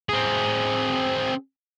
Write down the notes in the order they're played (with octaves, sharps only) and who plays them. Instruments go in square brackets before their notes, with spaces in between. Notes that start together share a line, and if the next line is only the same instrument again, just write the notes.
[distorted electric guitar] C4 G#4